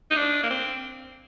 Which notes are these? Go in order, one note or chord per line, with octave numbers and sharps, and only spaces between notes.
D#4
D4
A#3
C4